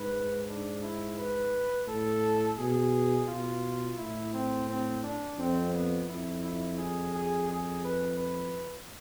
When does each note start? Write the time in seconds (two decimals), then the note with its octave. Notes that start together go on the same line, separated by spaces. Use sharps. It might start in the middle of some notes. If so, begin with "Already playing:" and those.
Already playing: G#2 B4
0.48 D4
0.83 E4
1.18 B4
1.87 A2 A4
2.58 B2 G#4
3.28 B2 F4
3.97 A2 E4
4.34 C4
4.69 C4
5.03 D4
5.38 F2 C4
5.74 B3
6.08 F2 E4
6.44 E4
6.78 G#4
7.13 G#4
7.49 G#4
7.84 B4
8.18 B4